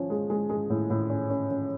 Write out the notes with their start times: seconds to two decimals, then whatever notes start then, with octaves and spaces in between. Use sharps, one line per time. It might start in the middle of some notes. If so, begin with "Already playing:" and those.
Already playing: F3 C#4
0.10 G#3
0.30 G#3
0.49 G#3
0.70 A2
0.90 A2
1.10 C#4
1.30 C#4
1.50 C#4